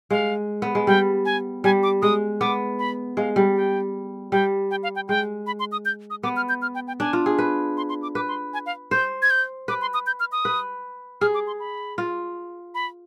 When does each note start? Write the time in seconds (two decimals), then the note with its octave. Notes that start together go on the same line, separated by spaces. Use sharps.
0.10 G#3 F5
0.62 B3
0.75 G#3
0.87 G3 G5
1.25 G#5
1.64 G3 G#5
1.83 D6
2.02 G#3 D#6
2.41 B3 D6
2.79 B5
3.17 G#3 F5
3.36 G3
3.56 G5
4.32 G3 G5
4.71 G5
4.83 F5
4.96 G5
5.08 G#3 G5
5.47 B5
5.60 C6
5.72 D#6
5.85 G6
6.10 D#6
6.23 B3 D6
6.36 F6
6.49 G6
6.62 F6
6.75 G5
6.87 G5
7.00 D4 G#5
7.13 F4
7.26 G#4
7.39 B4
7.77 C6
7.89 C6
8.02 D6
8.15 B4 D6
8.28 C6
8.53 G#5
8.66 F5
8.91 C5 G6
9.22 G#6
9.30 G6
9.68 B4 D6
9.81 C6
9.94 D#6
10.07 G6
10.20 F6
10.32 D#6
10.45 B4
11.21 G#4 F6
11.34 D6
11.47 C6
11.60 B5
11.98 F4
12.75 B5